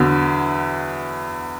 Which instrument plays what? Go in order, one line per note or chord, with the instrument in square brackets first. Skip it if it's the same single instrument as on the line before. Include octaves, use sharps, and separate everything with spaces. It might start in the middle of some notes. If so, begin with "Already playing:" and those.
Already playing: [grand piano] E2 D3 F#3